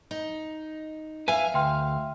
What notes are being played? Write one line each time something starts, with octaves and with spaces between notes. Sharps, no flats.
D#4
B4 E5 F5 G#5
D2 G5 C6 F6